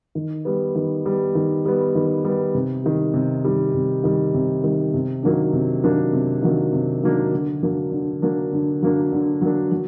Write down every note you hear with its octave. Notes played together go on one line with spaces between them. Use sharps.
D#3
G3 B3
D#3
G3 B3
D#3
G3 B3
D#3
G3 B3
C3
D#3 G3
C3
D#3 G3
C3
D#3 G3
C3
D#3 G3
C3
D#3 F#3 A#3 D4
C3
D#3 F#3 A#3 D4
C3
D#3 F#3 A#3 D4
C3
D#3 F#3 A#3 D4
D3
F#3 A#3 D4
D3
F#3 A#3 D4
D3
F#3 A#3 D4
D3
F#3 A#3 D4
F#3